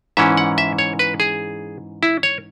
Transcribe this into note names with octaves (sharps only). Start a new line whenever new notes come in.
G#2 E3 C#4 E5
F#5
E5
C#5
B4
G#4
E4
C#5